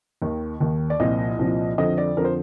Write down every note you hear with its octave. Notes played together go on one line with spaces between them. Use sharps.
D#2 D#3
D#2 D#3
D5
C2 A#2 F3 D#5
C2 A#2 F3
F2 D3 F3 D#5
D5
F2 D3 F3 A#4
C5